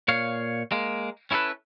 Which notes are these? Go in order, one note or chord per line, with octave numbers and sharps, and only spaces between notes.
A#2 C#5 F5
G#3 A#3
C#4 E4 G#4 A4 B4